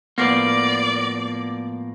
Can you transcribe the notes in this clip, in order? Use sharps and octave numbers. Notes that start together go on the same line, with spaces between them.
A2 F3 A#3 B3 D5 C7